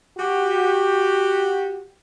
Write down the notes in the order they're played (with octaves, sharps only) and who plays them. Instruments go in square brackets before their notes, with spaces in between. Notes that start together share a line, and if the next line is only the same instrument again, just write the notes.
[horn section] F#4 G4